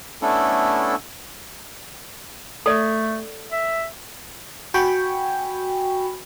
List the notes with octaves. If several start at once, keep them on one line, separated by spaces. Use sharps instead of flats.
A3 B3 C#4 D4 E4 A4
A3 A4 D5
E5
F#4 G5 G#5 B5 C#6